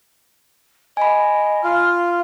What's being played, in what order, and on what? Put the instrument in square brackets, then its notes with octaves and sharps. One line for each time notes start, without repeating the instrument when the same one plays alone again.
[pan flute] D#5 [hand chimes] G#5 B5
[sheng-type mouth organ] F4 [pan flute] F6